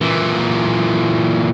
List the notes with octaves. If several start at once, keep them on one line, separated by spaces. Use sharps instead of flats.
A#2 E3